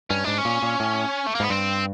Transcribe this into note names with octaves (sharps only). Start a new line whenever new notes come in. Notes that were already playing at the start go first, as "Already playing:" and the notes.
G2 C#4
G#2 D4
C#4
A#2
A#2
A2
A3
A#3
G#2 B3
G2 C4